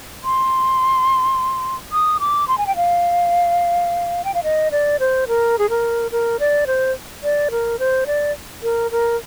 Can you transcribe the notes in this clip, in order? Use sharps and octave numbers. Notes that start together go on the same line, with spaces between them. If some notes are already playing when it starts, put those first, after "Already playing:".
C6
D#6
D6
C6
G#5
G5
F5
G5
F5
D#5
D5
C5
A#4
G#4
A#4
A#4
D5
C5
D5
A#4
C5
D5
A#4
A#4